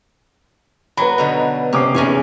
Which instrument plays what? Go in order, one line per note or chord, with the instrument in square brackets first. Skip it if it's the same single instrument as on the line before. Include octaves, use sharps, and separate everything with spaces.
[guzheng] F#3 [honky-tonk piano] B4 A#5 B5
[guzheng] B2 D3 D#4
[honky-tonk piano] C3 D6 C7 [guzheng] C#4
[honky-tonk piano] F1 [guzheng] E2 C#4 G#5